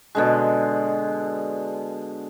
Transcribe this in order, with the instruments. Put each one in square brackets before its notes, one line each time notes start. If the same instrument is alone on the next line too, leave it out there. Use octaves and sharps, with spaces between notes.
[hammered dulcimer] B2 D3 G#3